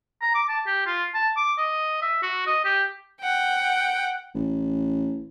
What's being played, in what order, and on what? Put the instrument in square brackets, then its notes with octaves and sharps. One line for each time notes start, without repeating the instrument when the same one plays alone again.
[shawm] A#5
D6
A5
G4
F4
A5
D6
D#5
E5
F#4
D#5
G4
[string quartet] F#5 G5
[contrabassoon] A1